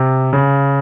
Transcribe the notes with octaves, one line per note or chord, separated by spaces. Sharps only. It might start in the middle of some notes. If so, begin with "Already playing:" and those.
Already playing: C3
C#3